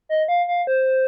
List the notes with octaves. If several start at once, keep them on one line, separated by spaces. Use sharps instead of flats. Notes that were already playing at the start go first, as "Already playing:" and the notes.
D#5
F5
F5
C5